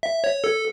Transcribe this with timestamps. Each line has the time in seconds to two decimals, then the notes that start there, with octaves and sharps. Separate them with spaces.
0.03 E5
0.24 C#5
0.44 A4